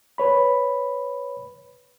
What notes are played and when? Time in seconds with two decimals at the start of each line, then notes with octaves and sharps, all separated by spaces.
0.18 B4 C#5 B5